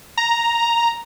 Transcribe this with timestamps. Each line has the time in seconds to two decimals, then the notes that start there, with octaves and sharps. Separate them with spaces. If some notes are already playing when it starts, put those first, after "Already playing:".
0.17 A#5